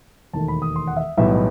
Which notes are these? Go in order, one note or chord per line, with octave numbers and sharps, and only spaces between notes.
E1 D#2 D#3 A3 A5
B5
D#6
C6
F#5
E5
B1 A2 E3 G3 B3 E5
D#5